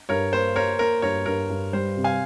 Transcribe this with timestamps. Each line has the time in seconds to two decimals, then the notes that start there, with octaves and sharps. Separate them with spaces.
0.09 G2 A#4 C#5
0.32 A#3 C5
0.55 A#3 A#4 C#5
0.79 A#3 A#4
1.02 G2 A#4 C#5
1.26 G2 A#4
1.50 G2
1.73 G3 C5
1.97 C3
2.04 F5 G#5